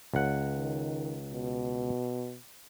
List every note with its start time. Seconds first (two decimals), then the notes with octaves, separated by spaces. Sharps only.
0.14 C#2 F#5
0.52 D#3
1.29 B2